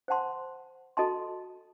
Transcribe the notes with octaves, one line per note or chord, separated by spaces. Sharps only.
C5 F#5 A5 C6
F#4 A4 D#5 A5 C6